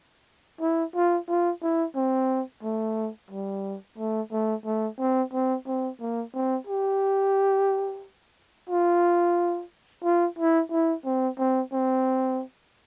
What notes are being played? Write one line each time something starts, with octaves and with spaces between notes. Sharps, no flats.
E4
F4
F4
E4
C4
A3
G3
A3
A3
A3
C4
C4
C4
A#3
C4
G4
F4
F4
E4
E4
C4
C4
C4